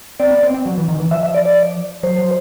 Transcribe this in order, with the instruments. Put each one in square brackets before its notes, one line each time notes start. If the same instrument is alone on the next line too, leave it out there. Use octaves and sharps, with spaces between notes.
[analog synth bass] C4 [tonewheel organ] D5
[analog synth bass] B3
C4
C4
F#3
E3
D#3
E3
[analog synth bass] F3 [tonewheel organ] E5
[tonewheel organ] E5
D5
D5
[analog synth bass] F#3 [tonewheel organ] C5
[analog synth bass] F#3